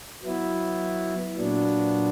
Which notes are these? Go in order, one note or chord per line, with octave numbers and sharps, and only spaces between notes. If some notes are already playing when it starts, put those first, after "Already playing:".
F#3 B3 E4
A#2 F#3 B3 D4